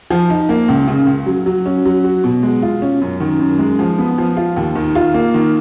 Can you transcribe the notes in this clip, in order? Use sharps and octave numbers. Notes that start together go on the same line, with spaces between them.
F3
D#4
A#3
C#2
C#3
C#2
F#3
F#3
C#4
F#3
F#4
B2
G#3
F4
C#4
F#2
D#3
F#2
G#3
F3
B3
F3
F4
D#2
D#3
F4
A#3
D#3